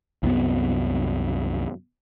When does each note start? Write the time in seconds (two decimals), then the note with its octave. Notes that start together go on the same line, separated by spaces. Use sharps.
0.23 C2 F#2 B3